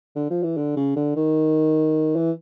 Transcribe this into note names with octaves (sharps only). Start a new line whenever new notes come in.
D3
F3
E3
D3
C#3
D3
D#3
E3